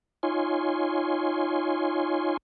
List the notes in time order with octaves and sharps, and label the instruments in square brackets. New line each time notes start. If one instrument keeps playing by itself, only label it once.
[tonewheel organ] D#4 F4 C#5 G#5 C6